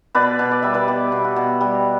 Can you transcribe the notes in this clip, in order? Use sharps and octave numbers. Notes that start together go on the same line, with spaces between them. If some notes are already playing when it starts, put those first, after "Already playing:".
B2 B4 D5
B2
D5
G3 E5
B4 D5
B3 G4
B2
F#4
B2
G3